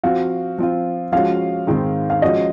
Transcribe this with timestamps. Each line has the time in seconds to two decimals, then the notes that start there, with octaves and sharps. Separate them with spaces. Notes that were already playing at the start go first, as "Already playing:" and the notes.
0.04 F3 C4 F#4 F5
0.58 F3 C4 F4
1.12 F3 G#3 C#4 F#4 F5
1.67 G#2 D#3 G#3 C4 D#4
2.10 F5
2.22 F3 G#3 C#4 F#4 D#5